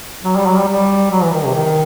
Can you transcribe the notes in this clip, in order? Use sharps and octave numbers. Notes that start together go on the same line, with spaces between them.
F#3
G3
F#3
G3
G3
F#3
E3
D#3
C3
D#3